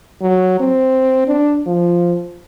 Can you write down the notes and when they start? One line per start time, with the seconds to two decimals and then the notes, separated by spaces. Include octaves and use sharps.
0.22 F#3
0.60 C4
1.27 D4
1.67 F3